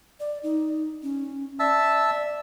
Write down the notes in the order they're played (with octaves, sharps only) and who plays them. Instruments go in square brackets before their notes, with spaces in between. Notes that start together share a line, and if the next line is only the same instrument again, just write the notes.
[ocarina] D5
D#4
C#4
[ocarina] D5 [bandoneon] E5 A5 E6